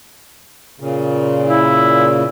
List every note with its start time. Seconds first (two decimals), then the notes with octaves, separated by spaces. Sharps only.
0.80 A#2 C#3
1.48 E4